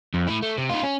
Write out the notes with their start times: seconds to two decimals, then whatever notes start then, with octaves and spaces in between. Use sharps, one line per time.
0.14 F2
0.28 A3 E4
0.43 A3
0.58 C3
0.70 D#4 F4
0.83 C#4